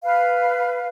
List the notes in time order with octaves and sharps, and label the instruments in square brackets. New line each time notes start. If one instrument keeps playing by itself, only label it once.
[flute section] B4 F5